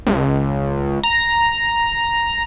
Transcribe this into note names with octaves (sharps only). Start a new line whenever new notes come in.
C#2
A#5